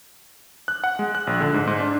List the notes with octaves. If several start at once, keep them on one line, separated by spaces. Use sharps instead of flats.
F#6
F#5
G#3
F#6
A#1
D3
G#2
G#2
D4